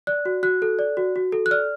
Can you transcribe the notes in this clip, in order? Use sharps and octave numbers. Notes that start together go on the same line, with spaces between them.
D5 F#6
F#4
F#4 F#6
A4
D5
F#4
F#4
A4
F#6
D5 F6